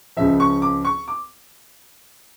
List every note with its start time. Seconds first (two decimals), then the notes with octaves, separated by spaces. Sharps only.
0.17 C#2 C#3 F3 E5
0.40 C#6
0.62 D6
0.85 C#6
1.08 D6